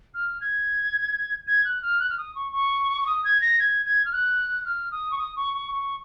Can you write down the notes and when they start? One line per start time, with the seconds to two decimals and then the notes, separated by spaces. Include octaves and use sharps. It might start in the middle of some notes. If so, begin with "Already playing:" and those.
0.14 F6
0.41 G#6
1.47 G#6
1.65 F#6
1.82 F6
2.00 F#6
2.10 F6
2.18 D#6
2.35 C#6
2.53 C#6
3.01 C#6
3.06 D#6
3.24 G#6
3.41 A#6
3.60 G#6
3.86 G#6
4.05 F6
4.12 F#6
4.65 F6
4.92 D#6
5.11 C#6
5.18 D#6
5.36 C#6
5.54 C#6
5.72 C#6